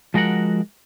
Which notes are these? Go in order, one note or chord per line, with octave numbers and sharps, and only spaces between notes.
F3 G#3 F#4 A#4 F#5